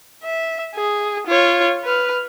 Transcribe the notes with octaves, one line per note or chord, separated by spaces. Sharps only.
E5
G#4
F4 C#5
B4 F6